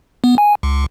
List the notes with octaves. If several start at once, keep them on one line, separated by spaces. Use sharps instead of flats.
B3
G#5
C#2